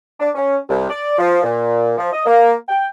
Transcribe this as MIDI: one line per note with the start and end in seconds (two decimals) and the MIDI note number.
0.20 0.29 62
0.35 0.57 61
0.69 0.87 36
0.90 1.15 74
1.19 1.38 53
1.43 1.93 46
1.98 2.10 53
2.13 2.25 75
2.26 2.54 58
2.69 2.87 79